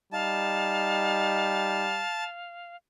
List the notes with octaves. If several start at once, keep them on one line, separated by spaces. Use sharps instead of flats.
G3 D#4 F5 A5